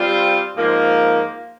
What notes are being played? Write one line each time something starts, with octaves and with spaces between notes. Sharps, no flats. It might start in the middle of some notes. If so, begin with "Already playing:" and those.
Already playing: G3 C4 F4 C5
G#2 F3 A#3 F4